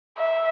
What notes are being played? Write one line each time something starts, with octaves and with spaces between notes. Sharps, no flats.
E5